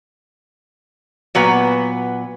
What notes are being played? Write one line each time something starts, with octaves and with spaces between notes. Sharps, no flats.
A#2 F#3 B3 B4